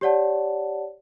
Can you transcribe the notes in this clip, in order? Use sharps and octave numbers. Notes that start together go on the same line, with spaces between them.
G4 C#5 D5 F#5 A5